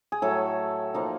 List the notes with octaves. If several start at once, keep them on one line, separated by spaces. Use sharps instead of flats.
G#4
A2 F#3 A3 A4
F3 A#3 D#4